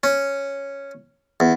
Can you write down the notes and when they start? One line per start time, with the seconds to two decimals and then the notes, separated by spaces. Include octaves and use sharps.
0.03 C#4
1.40 E2